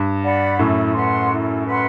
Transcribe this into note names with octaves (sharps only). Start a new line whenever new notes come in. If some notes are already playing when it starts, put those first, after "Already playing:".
Already playing: G2
D5 F#5 B5
F#2 A2 E4
B4 F#5 C6
E4
B4 F#5 C6